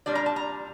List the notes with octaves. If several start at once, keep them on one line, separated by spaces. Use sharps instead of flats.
A#2 G3 D4 D5
A#5
A5
A#5